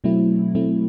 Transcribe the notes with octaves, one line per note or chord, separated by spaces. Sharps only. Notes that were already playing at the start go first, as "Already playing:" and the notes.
B2 F#3 A3 C4 E4
B2 F#3 A3 C4 E4